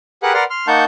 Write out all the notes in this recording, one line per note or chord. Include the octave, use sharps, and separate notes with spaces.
G4 G#4 A#4 B4 F#5 F#6
A#4 B4 D5 F#5 C6 F6
C6 F6
A#3 D#4 F#5 A5 C#6 G6